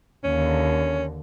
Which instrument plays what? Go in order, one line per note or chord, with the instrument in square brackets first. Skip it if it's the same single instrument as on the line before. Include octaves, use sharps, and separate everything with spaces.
[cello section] D#2 D3 [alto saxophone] C#4